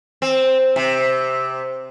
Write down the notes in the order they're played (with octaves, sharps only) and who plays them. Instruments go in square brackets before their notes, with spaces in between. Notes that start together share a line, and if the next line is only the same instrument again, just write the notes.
[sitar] C4
C3